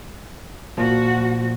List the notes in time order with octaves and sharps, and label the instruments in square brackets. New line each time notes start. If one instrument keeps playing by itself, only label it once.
[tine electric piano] A#2 F3 [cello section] F#4